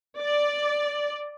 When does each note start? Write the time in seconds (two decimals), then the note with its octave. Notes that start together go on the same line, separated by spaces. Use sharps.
0.18 D5